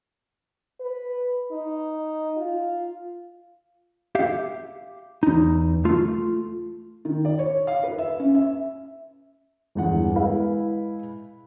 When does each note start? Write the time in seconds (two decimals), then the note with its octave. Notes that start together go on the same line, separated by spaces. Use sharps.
0.80 B4
1.51 D#4
2.37 F4
4.15 G4 E5 F5
5.23 E2 D#4
5.85 A3 F4
7.05 D#3
7.25 D5
7.39 C#5
7.67 F5
7.83 B4
7.98 E5
8.20 C#4
8.35 E5
9.75 G1 E2 F#5
10.15 G#3 E4 B4 F5